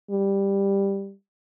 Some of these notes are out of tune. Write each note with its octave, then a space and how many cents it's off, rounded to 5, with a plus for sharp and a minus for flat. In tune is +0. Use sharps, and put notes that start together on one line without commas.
G3 +10